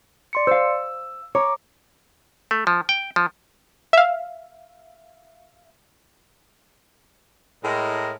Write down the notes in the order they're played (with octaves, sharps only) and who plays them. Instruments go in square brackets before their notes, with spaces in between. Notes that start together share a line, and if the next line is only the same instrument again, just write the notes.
[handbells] D5 C6 C#7
[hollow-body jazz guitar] C5 F5 [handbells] E6
[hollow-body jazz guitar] C#5 [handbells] A#5 D6
[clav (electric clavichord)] A3
F3
G5
F3
[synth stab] E5 F5
[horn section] A2 G#3 A#4